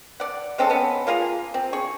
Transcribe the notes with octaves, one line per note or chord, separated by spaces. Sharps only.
D5 F#5
G#3 C4 C#4 A4
B3 C#4
A#3 F4 G#4 A#5
C4
G#4 C#6